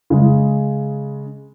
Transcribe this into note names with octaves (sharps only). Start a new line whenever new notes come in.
C#3 G#3